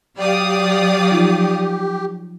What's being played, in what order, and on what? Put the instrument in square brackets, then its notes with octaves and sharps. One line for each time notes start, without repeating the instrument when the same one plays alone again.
[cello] F#3 [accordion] G4 [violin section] D5 F5 D#6
[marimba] F3 D#4 F4